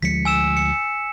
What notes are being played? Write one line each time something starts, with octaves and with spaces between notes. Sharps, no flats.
D2 F3 G#3 B6 C#7
G#5 E6 E7
C#7